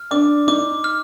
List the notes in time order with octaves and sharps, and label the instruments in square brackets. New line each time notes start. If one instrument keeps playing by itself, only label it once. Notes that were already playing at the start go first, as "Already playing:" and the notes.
Already playing: [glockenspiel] F6
[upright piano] D4 [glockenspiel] D6
[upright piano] D#4 [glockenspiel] D6
[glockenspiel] F6